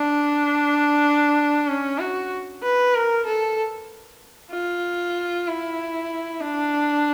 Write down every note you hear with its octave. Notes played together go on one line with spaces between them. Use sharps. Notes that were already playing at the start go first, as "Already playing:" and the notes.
Already playing: D4
C#4
F#4
B4
A#4
A4
F4
E4
D4